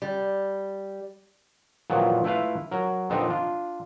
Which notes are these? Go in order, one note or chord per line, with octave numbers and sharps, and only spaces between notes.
G3
F2 A#2 D#3 E3 F#3 B3
A3 E4 F4 B4 F5
F#3 A#4
F2 A#2 B3 C4 D4 D#4
D4 F4